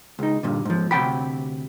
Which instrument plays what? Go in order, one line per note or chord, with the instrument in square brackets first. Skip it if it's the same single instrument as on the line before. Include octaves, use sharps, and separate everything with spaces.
[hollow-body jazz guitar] C#2 D#4
G2 A#2 D3
G#2 F3
D2 C3 D#3 F#5 G5 B5